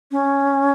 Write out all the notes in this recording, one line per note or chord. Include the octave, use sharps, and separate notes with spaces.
C#4